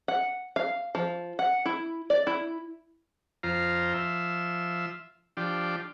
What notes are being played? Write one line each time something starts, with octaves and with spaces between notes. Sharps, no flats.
F#5
F5
F3
F#5
E4
D5
E4
F2 F4 C5 A#5
F3 E5
F3 D4 G4